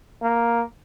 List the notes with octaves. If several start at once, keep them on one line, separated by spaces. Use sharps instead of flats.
A#3